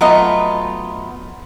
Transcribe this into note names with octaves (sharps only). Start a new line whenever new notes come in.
F#3 A3 B3 F4 D#5